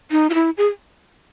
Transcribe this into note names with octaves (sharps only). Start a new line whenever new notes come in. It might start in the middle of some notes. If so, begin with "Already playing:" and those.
D#4
F4
E4
G#4